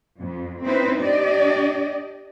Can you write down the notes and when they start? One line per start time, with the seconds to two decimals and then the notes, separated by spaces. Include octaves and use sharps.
0.20 F2
0.64 C4 C#4 D#4 E4 B4 C5
1.01 D4 G4 D5 D#5